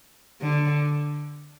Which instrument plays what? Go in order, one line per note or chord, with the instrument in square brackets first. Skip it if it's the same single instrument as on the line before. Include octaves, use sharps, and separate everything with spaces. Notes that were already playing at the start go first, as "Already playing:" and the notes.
[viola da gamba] D3